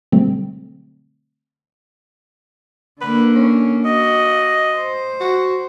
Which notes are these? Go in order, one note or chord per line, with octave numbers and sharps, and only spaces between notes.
B2 D3 F#3 G3 A3 C4
D3 A#3 B4
C#4
F#4 D#5
C5
F#4